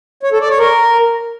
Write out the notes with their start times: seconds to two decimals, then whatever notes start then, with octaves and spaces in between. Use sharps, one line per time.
0.23 C#5
0.32 A4
0.41 D5
0.50 C#5
0.59 A#4